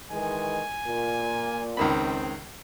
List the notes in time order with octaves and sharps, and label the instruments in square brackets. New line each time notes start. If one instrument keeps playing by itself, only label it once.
[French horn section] D#3 E3 G#3 [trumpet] G#5
[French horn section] A#2
[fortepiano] C#2 D#3 B5 [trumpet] C4